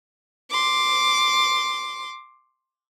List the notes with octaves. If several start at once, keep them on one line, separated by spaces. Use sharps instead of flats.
C6 D6